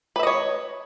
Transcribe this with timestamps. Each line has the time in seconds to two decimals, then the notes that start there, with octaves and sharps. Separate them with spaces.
0.16 B4
0.19 E5
0.23 D#5
0.27 C#5